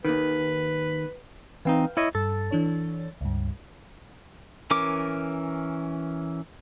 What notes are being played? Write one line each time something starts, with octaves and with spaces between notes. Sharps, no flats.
D#2 D#3 B4
E3 C4 D#4 B4 F5 G5
E4 C#5 D#5
G2 A4
E3 D4 C#5
C#2 G2
E3 C#4 A#4 D6